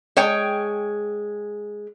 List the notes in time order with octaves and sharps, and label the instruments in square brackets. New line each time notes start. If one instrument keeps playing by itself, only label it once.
[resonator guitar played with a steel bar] G#3 C#5 G5